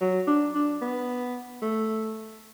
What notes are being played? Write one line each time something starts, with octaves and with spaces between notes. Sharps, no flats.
F#3
D4
D4
B3
A3